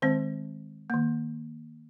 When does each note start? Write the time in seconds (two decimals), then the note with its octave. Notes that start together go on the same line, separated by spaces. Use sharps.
0.02 D#3 G#3 C4 C5
0.90 D#3 A#3